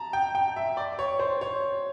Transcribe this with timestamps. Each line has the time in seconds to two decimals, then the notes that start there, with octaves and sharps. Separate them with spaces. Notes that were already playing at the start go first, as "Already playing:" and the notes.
Already playing: A5 A#5
0.13 G5
0.35 G5
0.56 E5
0.77 D5
0.99 C#5
1.19 C5
1.41 C#5